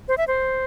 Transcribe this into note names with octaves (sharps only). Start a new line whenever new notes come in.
C5
E5
C5